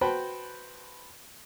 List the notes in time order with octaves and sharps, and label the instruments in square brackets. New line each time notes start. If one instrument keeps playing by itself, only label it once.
[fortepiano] F#4 B4 C5 G5 A5 B5